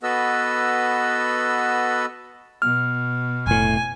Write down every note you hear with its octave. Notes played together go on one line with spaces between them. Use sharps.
B3 F#4 A4 B4 D#5 E6
B2 F6
F1 A2 G#5